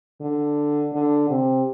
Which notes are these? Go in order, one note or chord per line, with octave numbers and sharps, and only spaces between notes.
D3
D3
C3